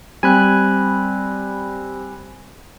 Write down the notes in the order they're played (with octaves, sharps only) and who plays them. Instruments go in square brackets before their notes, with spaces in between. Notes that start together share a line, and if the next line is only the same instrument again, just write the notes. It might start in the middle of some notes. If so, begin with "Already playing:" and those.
[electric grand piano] G3 C4 [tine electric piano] G#5 B5 F#6